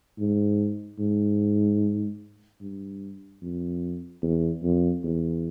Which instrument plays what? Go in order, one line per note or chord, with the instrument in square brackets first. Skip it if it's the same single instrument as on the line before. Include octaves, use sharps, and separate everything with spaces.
[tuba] G#2
G#2
G2
F2
E2
F2
E2